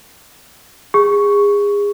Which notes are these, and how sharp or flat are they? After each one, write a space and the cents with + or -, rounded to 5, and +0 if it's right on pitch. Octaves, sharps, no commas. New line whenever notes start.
G#4 -30